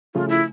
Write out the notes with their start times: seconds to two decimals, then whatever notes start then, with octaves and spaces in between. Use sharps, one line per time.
0.15 C#3 F3 A3 F4
0.29 E4